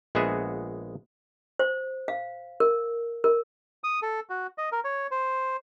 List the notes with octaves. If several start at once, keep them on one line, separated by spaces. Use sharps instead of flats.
A#1 G#3 B3 F#4 G#4 E5
C5
F5
A#4
A#4
D#6
A4
F#4
D#5
A#4
C#5
C5